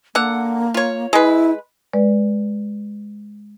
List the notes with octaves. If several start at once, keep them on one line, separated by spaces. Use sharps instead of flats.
D3 A#3 F#5
F4 C#5
G#3 E4 B4
G#3 B4 D5